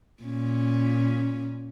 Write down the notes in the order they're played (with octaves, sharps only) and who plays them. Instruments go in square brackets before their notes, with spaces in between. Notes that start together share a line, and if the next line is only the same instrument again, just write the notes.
[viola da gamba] A#2 C#4